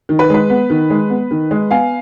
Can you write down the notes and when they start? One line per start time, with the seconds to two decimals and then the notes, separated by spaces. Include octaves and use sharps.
0.09 D#3
0.19 B4
0.30 G#3 B4
0.50 B3
0.70 D#3
0.90 G#3
1.10 B3
1.31 D#3
1.51 G#3
1.71 B3 F5 G#5